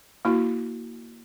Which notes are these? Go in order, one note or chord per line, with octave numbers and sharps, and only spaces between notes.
A#3 E4 F#4